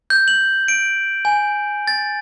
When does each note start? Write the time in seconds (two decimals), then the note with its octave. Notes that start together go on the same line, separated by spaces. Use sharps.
0.10 G6
0.28 F#7
0.68 D7
1.25 G#5
1.87 A6